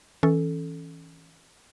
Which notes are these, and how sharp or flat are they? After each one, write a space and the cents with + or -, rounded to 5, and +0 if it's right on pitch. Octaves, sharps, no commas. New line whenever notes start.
E3 -20 C#4 +0 A4 -5